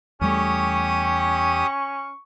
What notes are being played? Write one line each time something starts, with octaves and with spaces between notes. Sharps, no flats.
E2 G3 A3 C#4 G4 C#6 D#6